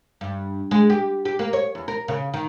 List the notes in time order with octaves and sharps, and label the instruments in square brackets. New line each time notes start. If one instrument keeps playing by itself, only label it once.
[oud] G2
G#3
G4
G4
A#3
C#5
E2
A#4
C#3
D#3